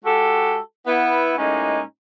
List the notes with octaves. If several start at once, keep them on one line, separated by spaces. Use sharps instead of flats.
G#3 F#4 G4 A4
B3 E4
A2 G#3 A#3 C#4 D#4